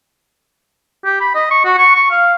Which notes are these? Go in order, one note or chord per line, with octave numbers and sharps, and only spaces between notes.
G4
B5
D#5
C#6
F#4
C#6
C#6
F5